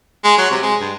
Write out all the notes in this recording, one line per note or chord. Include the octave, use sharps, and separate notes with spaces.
G#3
F#3
C3
G#3
G2